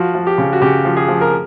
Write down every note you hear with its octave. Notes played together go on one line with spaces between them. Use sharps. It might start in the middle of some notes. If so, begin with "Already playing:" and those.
Already playing: F3 F#4
F3
G4
C#3
F#4
C#3 G4
F3
G#4
F3
A#4